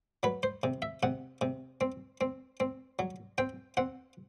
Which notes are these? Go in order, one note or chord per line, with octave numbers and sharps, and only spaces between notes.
F#3 B4
C5
C3
E5
C3 F#5
C3
C4
C4
C4
F#3
C4 G5
C4 F#5